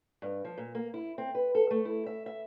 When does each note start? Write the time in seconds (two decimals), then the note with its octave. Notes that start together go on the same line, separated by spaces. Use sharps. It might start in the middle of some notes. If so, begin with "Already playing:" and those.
0.22 G2
0.45 F3
0.58 A#2
0.75 A#3
0.94 E4
1.18 C4
1.35 B4
1.55 A4
1.71 A3
1.85 E4
2.06 E5
2.26 E5